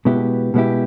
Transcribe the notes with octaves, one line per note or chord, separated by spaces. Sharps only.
B2 G#3 B3 E4 G4
B2 G#3 B3 E4 G4